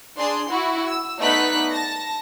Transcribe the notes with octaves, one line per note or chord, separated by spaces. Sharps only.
D4 G#4 C6
E4 F#4
E6
A3 B3 D#4 D5 F#6 B6
A5 A#6